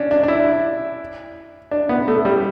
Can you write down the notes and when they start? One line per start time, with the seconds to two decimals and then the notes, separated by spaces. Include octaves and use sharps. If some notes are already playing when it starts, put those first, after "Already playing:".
Already playing: C#4 D4
0.11 D4
0.23 D4
0.28 E4
1.71 D4
1.89 B3
2.08 A3
2.25 G3